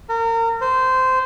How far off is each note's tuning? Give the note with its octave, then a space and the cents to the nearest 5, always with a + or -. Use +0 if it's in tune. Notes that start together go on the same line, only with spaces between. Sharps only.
A#4 -30
C5 -15